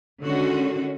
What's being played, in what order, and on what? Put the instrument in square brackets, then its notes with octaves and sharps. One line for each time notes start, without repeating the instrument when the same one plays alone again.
[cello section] D3 D#3 G#3 C#4 F#4